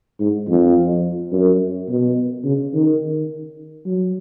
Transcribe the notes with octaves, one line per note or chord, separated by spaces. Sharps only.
G#2
F2
F#2
B2
C#3
D#3
F#3